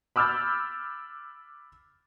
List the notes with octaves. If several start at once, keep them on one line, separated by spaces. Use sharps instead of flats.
B5 D6 E6 F6 G6 A6